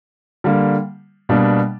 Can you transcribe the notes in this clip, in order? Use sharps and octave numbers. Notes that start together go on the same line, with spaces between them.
D3 G3 A#3
B2 G3 A#3 D4